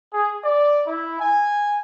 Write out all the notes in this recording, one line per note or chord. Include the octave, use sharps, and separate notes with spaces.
G#4
D5
E4
G#5